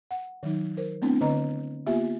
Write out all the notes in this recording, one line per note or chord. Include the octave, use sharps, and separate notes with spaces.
F#5
D#3 F#3 D#4
A#4 C5
A3 B3 C4 D4 E4
D3 B4 D#5 A#5
A#3 B3 F4 G4 E5